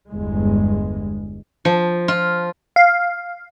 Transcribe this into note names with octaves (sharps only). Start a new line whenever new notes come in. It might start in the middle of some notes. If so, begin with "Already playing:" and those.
G1 E2 G#3
F3
F4
F5